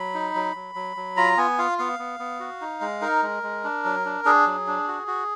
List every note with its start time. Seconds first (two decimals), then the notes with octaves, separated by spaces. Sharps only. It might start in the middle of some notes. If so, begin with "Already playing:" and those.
Already playing: F#3 B5
0.14 D#4
0.35 F#3
0.55 F#3
0.75 F#3
0.97 F#3
1.17 F4 A#5
1.37 B3 G#5
1.59 F4 F5
1.78 B3 F5
1.99 B3
2.20 B3
2.40 F#4
2.61 D#4
2.81 G#3
3.01 D#4 A#4
3.22 G#3
3.43 G#3
3.64 D4
3.85 F#3
4.05 D4
4.25 D4 G#4
4.46 F#3
4.67 D4
4.88 F#4
5.08 F#4